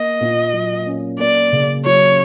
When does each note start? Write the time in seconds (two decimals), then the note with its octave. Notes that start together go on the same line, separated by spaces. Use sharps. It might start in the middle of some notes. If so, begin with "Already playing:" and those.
Already playing: A#3 D#5
0.21 A#2
0.53 F#3
0.87 C#4
1.19 A#3 D5
1.52 C#3
1.85 F#3 C#5